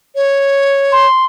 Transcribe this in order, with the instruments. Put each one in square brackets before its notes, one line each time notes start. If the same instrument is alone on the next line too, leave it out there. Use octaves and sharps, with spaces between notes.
[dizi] C#5
[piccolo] C6